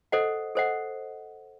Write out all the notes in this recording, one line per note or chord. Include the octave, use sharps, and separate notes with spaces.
A4 C5 D#5 F#5
A4 C5 D#5 F#5